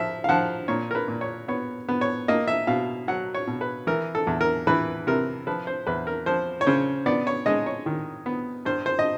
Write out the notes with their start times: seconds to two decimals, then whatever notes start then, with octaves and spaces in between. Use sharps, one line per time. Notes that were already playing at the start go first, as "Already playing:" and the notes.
Already playing: F3 E5
0.24 F5
0.29 F3 F#5
0.68 A#2 C#5
0.91 A#4
0.95 B4
1.08 A#2
1.21 C#5
1.48 B3 C#5
1.89 B3
2.01 C#5
2.28 A#3 D#5
2.48 E5
2.67 B2 F5
3.08 F#3 F#5
3.34 C#5
3.47 B2
3.61 B4
3.87 E3 A#4
4.15 A4
4.27 E2
4.41 A#4
4.67 E3 B4
5.07 C3 A#4
5.47 F3 B4
5.67 C5
5.87 E2 B4
6.07 A#4
6.26 F3 C5
6.61 C#5
6.67 C#3 C5
7.06 B3 D5
7.27 C#5
7.46 G#3 D#5
7.66 C#5
7.86 D#3
8.26 B3
8.65 G2 C5
8.86 C5
8.99 D#5